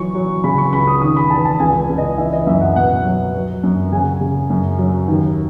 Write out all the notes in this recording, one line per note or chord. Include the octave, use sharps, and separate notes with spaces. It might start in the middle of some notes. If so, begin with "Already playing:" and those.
Already playing: E3 F#3 C#6
F#3
C#3 B5
C#6
C#2 B5
D#6
D#3 D#6
B5
E2 A5
A5
C#2 G#5
C#2
D#5
E3 E5
D#5
F#2 E5
F#5
B2 F#5
F#3
F#3
F#2
C#3 G#5
C#3
F#2
F#3
D#2